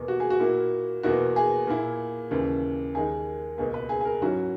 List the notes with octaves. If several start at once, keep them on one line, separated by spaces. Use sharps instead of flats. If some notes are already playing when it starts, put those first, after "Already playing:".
Already playing: E2 B2 A#3
F#4
G#4
F#4
A#2 A#3 E4
E2 B2 A#3 E4 F#4
G#4
A#2 A#3 E4
D#2 C#3 E3
D#2 D#3 G#3 D#4 G#4
C#2 B2 A#3 G#4
B4
G#4
G#4
A#4
G#2 F#3 C#4 E4 F#4